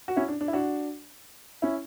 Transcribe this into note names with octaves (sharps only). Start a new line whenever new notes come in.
F#4
C#4 E4
D4
D4
E4
D4 F#4
C#4 E4